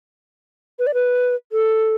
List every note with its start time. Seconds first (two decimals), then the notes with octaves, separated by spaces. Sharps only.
0.79 B4
0.87 D5
0.94 B4
1.52 A4